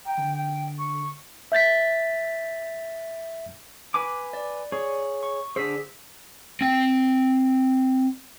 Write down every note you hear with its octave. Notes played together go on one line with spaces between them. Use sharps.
G5 A#5
D3
G5
C#6
E5 G6 A6 B6
B4 G#5 D6
D5
G#4 C#5
C#6
D3 G#4 C5 E6 B6
C4 G5